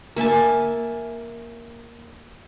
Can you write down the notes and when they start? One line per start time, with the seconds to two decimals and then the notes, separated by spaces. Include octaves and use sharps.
0.16 A#3 E5 G#5 A5